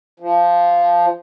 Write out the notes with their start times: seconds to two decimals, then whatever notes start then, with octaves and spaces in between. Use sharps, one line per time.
0.20 F3